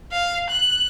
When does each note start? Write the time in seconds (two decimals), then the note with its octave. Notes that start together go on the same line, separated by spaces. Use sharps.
0.12 F5
0.50 F#6